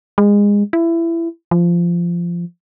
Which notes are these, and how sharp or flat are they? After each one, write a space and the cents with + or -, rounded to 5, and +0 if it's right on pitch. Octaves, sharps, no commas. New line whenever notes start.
G#3 -25
E4 +20
F3 -15